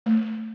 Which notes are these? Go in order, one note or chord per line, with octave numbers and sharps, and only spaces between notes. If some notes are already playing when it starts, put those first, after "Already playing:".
A3